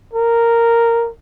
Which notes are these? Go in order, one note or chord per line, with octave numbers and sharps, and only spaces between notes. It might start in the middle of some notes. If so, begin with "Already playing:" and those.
A#4